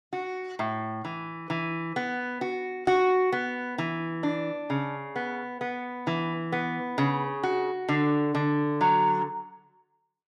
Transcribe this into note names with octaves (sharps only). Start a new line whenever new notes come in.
F#4
A2
E3
E3
B3
F#4
F#4
B3
E3
D4
C#3
B3
B3
E3
B3
C#3
F#4
D3
D3
F#3